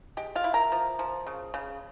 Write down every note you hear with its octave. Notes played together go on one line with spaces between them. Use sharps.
G#3 G4
F4 F5
E4
A#4 A#5
F3
F3
C#3
C#3